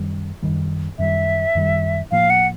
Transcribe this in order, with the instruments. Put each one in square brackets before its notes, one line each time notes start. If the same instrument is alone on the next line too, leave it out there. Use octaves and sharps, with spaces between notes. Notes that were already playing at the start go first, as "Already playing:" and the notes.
Already playing: [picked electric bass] F#2 D#3 G3
F#2 D#3 G3
[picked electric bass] F#2 D#3 G3 [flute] E5
[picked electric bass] F#2 D#3 G3
[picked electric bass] A2 F3 A#3 [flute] F5
[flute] F#5